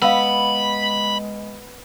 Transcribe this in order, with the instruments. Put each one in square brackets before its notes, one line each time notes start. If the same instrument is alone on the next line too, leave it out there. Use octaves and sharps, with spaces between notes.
[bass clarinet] G#3 [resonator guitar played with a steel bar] B3 [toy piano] F5 E6 [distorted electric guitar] B5